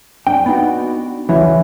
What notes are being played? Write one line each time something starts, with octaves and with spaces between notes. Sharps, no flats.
D4 G5
B3 D#4 F#4
D2 C#3 E3 F#3 E4